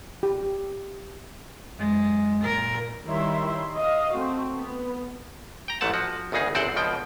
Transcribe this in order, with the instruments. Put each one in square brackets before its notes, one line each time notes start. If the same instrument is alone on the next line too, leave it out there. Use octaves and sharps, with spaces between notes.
[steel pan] G4
[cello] F#2 G#3
A#2 A#4
[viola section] D#3 G3 E4 C#5 E5 C6
D#5 F5
A3 C4 F#4
B3
[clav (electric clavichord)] G5 A#5
A1 G#2 A3 F#5 A5
F3 F#4
G#1 D2 C#3 D#4 G#4
G1 E2 C4 C5 D5 F#5
C#2 B2 F3 G5